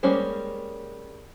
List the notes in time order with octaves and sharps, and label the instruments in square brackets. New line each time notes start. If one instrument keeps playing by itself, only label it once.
[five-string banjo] G3 G#3 A#3 C#4 C5